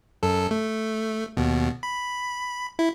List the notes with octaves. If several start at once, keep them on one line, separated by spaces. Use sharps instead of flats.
F#2 A4
A3
D#2 B2
B5
E4